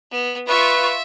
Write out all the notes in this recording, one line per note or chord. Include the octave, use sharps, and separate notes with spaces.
B3
F4 B4 E5 C#6